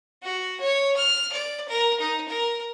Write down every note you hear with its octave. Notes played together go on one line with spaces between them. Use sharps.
F#4
C#5
F6
D5
A#4
D#4
A#4